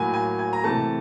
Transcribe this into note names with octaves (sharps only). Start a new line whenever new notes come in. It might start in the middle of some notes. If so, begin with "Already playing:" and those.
Already playing: A2 F#3 A#3 G#5
G#5
G#5
A#5
C3 E3 A3 A5